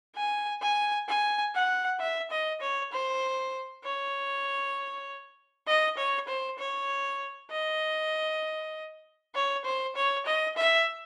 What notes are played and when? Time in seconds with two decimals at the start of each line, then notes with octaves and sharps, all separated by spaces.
0.16 G#5
0.62 G#5
1.08 G#5
1.55 F#5
2.00 E5
2.31 D#5
2.61 C#5
2.92 C5
3.84 C#5
5.67 D#5
5.97 C#5
6.28 C5
6.58 C#5
7.51 D#5
9.35 C#5
9.65 C5
9.96 C#5
10.26 D#5
10.57 E5